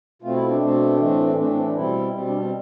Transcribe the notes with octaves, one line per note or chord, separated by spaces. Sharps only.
B2 A3 C4 F4
E4
D4
B2 A3 C4
A2 E3 A3 C4
A2 E3 A3 C4 D4
C4
D4
B2 G3 C4 E4
B2 G3 C4
D4
C4